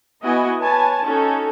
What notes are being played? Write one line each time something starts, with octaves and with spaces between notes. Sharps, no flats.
B3 E4 F#4 D#5 G#5
B4 C#5 G#5 A5
C#4 D#4 F#4 A4